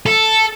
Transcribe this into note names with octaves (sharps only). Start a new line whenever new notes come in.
A4